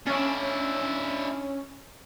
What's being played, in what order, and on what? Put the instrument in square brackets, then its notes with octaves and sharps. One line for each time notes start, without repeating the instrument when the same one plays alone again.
[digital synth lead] C#4 [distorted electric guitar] D4 E4